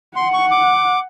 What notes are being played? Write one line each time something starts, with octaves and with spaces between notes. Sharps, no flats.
F#5 C6
C#6
D6